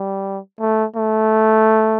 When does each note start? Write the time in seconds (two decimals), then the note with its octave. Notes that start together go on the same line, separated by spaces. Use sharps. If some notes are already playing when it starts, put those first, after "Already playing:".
Already playing: G3
0.60 A3
0.96 A3